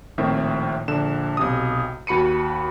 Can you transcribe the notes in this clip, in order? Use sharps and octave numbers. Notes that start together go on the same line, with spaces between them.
A#1 A2 D#3 C4 E5
A#1 D3 E7
B1 C3 D#6
D#2 F#4 B5 C#7 D#7